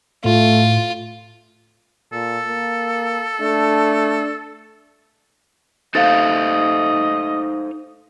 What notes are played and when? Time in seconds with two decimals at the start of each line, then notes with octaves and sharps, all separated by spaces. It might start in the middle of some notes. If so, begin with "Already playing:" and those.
0.25 A2 A3 F4
2.12 A#2 A4
2.48 A#3
3.40 A3 D4
5.95 D#4 A4 C5 D#5 F5 A6